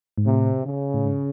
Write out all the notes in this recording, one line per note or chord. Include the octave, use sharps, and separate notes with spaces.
G#2
A2 C3
C#3
A2
G#2